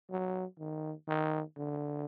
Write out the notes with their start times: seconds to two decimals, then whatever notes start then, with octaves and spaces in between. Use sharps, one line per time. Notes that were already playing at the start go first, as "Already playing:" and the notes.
0.10 F#3
0.59 D#3
1.08 D#3
1.57 D3